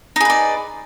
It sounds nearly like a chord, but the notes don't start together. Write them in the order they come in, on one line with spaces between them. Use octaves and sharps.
D#4 G#4 B4 D5